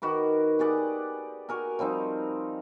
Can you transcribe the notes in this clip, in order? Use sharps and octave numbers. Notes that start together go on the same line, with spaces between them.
D#3 F#4 B4 D6
G4 G#4 D5 F#5
F#4 A#4 G#5
F3 G3 C4 D#4